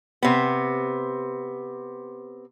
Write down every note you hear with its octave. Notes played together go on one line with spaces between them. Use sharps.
C3 B3